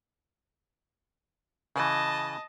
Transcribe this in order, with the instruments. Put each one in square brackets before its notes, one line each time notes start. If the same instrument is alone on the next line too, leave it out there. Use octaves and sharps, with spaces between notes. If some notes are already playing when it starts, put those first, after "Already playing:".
[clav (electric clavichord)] C#3 E3 [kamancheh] D#5 A5